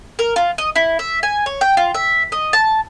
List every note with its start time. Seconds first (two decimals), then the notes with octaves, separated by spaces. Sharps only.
0.19 A#4
0.36 F4
0.58 D#5
0.76 E4
0.99 E5
1.23 G#5
1.46 C#5
1.61 G5
1.77 F4
1.94 E5
2.32 D#5
2.53 A5